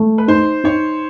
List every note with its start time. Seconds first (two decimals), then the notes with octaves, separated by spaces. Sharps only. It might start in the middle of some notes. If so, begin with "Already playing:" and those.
Already playing: A3
0.18 B4
0.28 D#4 C5
0.64 D#4 C#5